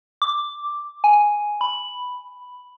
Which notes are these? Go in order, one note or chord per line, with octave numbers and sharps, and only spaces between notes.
D6
G#5
B5